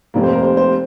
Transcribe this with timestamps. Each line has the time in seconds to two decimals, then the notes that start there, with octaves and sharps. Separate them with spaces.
0.14 F1 F2 C3 F3 A#3
0.24 C5
0.32 A#4
0.43 C5
0.57 C5